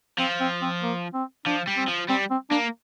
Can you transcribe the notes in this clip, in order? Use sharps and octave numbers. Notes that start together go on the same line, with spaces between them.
F3 C4
C4
C4
A#3
C4
F3 D4
G3
C4
F3
G3 C4
C4
A#3 D4